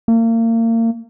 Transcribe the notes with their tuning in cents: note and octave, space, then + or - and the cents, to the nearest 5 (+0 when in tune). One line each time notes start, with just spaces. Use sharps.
A#3 -35